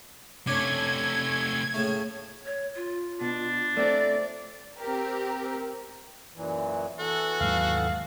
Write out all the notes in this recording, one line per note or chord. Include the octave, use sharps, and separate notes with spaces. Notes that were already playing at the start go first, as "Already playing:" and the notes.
C3 A3 C#4 D4 G#6
A2 C#3 A3
C#5
F4
B2 D4
A3 C4 D5
C4 G4 A#4
F#2 A#2 E3
E3 B3 F#4 A4
D#2 G#2 F#3 F5